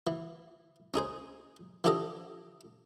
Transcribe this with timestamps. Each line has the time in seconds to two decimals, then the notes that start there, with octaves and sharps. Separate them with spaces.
0.07 E3
0.94 C#4 D#4 G#4 C5
1.84 E3 F3 D4 G4 A4 D#5